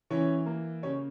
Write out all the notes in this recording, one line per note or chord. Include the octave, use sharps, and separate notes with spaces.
E3 C#4 C#5
A#3
C#3 C#4 C#5